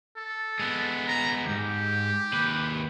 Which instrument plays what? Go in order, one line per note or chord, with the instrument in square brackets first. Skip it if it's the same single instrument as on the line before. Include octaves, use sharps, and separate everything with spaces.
[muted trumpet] A4
[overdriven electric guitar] G#3 B3
[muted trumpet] A#5
[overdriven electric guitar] E2 G#2 [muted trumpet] G4
[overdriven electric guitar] D#2 B4